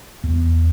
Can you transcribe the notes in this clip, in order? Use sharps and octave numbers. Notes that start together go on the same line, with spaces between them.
E2